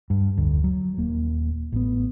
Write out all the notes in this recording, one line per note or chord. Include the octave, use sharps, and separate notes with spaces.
G2
F1 D2
F#3
D#1 A#3
A1 B3